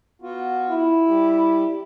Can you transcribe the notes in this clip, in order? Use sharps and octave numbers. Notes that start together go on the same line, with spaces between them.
B3 F4 F#4
E4
G3 G4